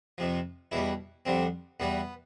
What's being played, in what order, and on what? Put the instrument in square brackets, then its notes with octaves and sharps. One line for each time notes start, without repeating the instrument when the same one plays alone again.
[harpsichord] F2 C3 F3
E2 B2 G3 E4
F2 D3 G3 C4
E2 B2 G3 B3